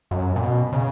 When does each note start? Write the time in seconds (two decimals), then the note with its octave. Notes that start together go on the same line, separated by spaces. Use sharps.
0.11 F#2
0.36 A#2
0.41 B2
0.72 C#3